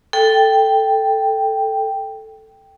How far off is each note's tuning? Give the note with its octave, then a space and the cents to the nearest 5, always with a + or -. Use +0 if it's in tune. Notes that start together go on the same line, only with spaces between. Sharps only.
A4 +0 G5 +0